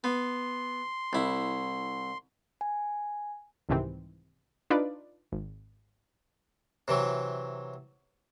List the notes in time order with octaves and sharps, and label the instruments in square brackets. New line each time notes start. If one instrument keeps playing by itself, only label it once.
[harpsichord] B3 [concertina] C6
[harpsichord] C2 E4
[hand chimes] G#5
[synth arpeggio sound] C2 G#2 C3 D#3 E3 C4
D4 D#4 F4 B4 D5
G#1
[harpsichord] C3 E3 F#3